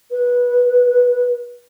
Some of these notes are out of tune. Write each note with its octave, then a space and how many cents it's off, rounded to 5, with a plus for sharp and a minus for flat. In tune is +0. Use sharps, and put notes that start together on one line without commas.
B4 -20